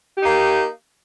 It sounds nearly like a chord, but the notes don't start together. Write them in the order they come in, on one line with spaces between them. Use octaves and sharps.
G4 D#4 A#3